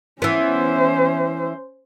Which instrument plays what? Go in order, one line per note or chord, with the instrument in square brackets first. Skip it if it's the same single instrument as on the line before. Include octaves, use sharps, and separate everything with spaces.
[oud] E3 B3 [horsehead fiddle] C#4 C5